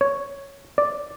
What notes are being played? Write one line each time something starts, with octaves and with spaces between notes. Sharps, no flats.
C#5
D5